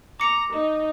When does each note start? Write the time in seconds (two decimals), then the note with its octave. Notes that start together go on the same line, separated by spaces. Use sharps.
0.20 A#5 D6 C#7
0.53 D#4